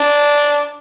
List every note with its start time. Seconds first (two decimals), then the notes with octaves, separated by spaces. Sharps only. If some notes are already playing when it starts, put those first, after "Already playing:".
Already playing: D4